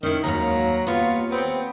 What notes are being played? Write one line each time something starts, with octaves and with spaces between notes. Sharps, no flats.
D#3 C#4 E4
D#2 G#2 F#3 F5 A#5
D#2 B3 F4 C#5
B3 C4